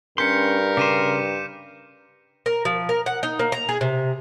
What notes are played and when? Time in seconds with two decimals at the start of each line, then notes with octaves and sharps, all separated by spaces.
0.18 G2 C#4 A#4 C6 G6 B6 C#7
0.77 C#3 C6 D6 D#7 E7
2.46 A#4
2.65 F3
2.89 A#4
3.06 F#5
3.23 D#4
3.39 A#3
3.52 A#5
3.69 G#4
3.81 C3